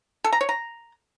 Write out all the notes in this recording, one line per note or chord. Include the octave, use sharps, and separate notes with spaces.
A4
A#5
C#5
A#5